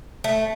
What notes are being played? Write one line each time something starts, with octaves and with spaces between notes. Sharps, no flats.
A3